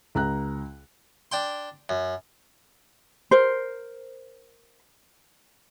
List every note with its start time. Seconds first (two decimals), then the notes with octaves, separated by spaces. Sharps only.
0.15 C#2 A#5 F#6
1.32 D4 G5 C6
1.89 F#2
3.31 A#4 C5